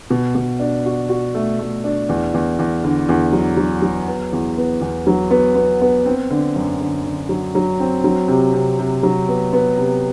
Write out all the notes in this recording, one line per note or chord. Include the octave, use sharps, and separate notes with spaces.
B2
B2
D4
F#4
F#4
A3
A3
D4
E2
E2
E2
D3
E2
F#3
F#3
F#3
B3
E2
B3
E2
F#3
B3
B3
B3
C4
D3
F#2
D3
D3
F#3
F#3
C4
F#3
C3
C3
C3
F#3
B3
B3
C3